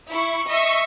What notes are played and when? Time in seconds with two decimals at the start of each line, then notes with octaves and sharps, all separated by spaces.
0.11 E4 C#6
0.49 D#5 E5 C#6 E6 B6